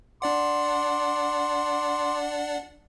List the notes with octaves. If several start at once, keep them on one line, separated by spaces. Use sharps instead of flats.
D4 D5 F#5 C6 D6